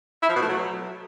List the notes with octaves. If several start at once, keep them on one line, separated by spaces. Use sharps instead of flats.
E4
F3
B2
A3
F#3